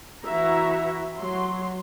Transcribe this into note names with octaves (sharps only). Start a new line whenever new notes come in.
E3 E4 F#4 E5 A#5
F#3 C6